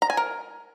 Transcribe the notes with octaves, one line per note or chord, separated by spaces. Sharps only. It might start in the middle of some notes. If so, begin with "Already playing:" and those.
A#5
G#5
A#4